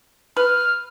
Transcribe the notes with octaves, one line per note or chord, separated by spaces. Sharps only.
B4 F6